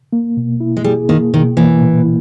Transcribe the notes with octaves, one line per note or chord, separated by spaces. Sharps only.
A#3
B2
E4
G#3
G3 G#4
D#3 A#3
B2 D#3
E3 A#3
A#2